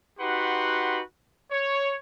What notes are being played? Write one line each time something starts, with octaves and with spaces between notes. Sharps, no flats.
D#4 F#4 G4 B4 F#5 C6
C#5